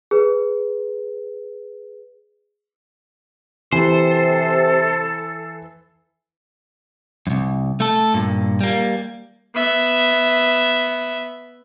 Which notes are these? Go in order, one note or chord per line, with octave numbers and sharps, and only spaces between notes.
G#4 B4
C3 E3 A4 C5
C2 F#2
A3 A4
G2 A#2
G3 A#3
B3 E5